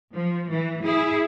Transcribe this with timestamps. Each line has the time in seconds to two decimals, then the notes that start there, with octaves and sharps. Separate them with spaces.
0.15 F3
0.51 E3
0.84 E4 G#4